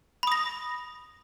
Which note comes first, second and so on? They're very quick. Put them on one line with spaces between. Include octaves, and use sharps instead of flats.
B5 D#6 A#6